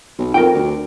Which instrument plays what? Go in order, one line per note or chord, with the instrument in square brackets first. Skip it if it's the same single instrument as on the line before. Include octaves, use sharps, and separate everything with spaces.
[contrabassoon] B1
[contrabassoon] F2 [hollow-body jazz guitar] A#4 G5
[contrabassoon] D2